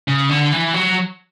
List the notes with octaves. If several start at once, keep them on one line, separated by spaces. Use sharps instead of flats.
C#3
D3
E3
F#3